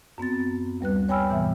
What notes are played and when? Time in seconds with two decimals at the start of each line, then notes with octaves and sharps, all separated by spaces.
0.18 F#2 B3 C4 A6
0.81 D2 G3 B4 F#6
1.08 C#5 G5 G#5 B5 E6 F6
1.29 G#2 B2 E3 B3 E5